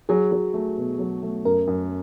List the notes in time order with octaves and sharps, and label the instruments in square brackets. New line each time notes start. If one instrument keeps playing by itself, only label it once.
[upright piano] F#3 [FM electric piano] G#4
[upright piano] F#3
A3
B2
F#3
A3
[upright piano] F#2 [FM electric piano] A#4
[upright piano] F#2